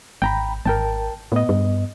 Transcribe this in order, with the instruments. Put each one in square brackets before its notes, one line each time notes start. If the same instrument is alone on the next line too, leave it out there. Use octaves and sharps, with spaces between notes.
[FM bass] G#1 [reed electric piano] G5 A#5 B5
[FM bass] G#1 [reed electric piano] A#4 G5 A5
[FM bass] A2 [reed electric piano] B3 D#5
[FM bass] G2